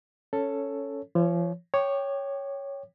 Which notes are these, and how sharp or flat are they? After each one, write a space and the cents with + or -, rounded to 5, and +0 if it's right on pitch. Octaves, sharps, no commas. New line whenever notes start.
C#4 +0 A4 +5 C#5 +0
F3 -35 C#5 +0
C#5 +0 G5 +0 D6 +35